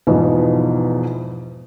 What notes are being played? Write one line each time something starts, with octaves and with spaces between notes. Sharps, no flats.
E2 G#2 B2 F3